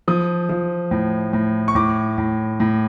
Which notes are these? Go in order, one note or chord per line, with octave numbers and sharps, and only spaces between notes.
F3 D#6
F3
A2
A2
C#6
A2 D6
A2
A2